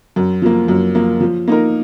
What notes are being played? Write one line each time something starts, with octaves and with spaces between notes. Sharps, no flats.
F#2
F3 A#3
F#2
F3 A#3
F3
A#3 D#4 A#4